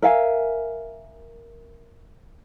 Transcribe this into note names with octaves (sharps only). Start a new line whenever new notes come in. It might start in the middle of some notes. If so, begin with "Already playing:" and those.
A#4 E5 F5 G#5